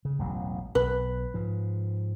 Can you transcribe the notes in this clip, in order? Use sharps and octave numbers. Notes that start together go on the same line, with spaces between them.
C#3
E1 A1 F#3
B1 B4
G#2 F3